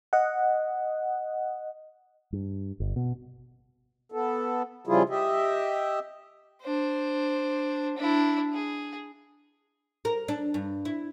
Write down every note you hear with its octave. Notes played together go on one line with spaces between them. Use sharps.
D#5 F#5
G2
G1
B2
B3 A4
C#3 F3 G3 E4 F4 G#4
G4 D#5 E5
D4 C5
D4 E4
G#4
A#4
D4
G2
E4